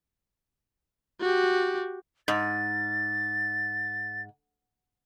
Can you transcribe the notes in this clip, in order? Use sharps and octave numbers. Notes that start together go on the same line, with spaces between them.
F#4 G4
G#2 A6